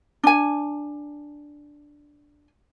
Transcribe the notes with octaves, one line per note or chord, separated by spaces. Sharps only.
D4 G#5